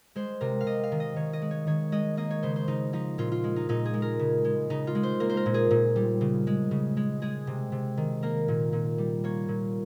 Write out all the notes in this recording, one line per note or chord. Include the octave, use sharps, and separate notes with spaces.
G#3 C5
C3 A#4
F5
C3 D#5
F5
D#3
D#5
D#3 C#5
D#5
G#3
C#5
D#3 C#5
G#3 D#5
A#3 D#5
C#5
C#3 C5
C5
C#3 D#4
F3 D#4
A#2 F4
F4
G#3
D#4
A#2 D#4
G#4
G#3
A#4
C#3
G#3
C#3 D#4
F4
G#3
C5
A#3 A#4
C5
A#4
A#2
G#4
A#2
G3
C#3
G#3
C#3
G#3
G#3 G#4
C3
C3
D#3
A#3 A#4
A#2
A#2
G3
A#3 C#5
A#2